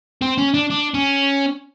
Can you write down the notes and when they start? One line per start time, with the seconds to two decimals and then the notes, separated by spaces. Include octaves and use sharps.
0.22 C4
0.38 C#4
0.54 D4
0.70 D4
0.94 C#4